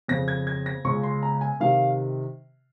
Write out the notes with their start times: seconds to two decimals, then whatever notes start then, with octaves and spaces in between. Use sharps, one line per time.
0.08 F2 C#3 A#6
0.28 G#6
0.47 G#6
0.66 A#6
0.84 C#2 C#3 C#6
1.03 C6
1.23 A#5
1.41 G#5
1.60 C3 D#3 F5